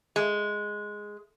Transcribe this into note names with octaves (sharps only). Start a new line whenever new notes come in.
G#3